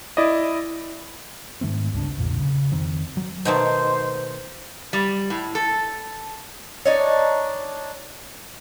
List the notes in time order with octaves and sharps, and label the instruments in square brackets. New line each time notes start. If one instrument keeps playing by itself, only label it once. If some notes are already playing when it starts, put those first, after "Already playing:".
[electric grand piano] E4 D5 D#5
[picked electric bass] G#2 D#3 A3 C4
G1 C#2 D4
B1 F2 A#2 D3
C#3
F2 D#3 C4
F#3
[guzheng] B2 D#3 A3 [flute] C5
[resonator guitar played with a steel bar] G3
A2
A4
[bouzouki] D4 D#4 C#5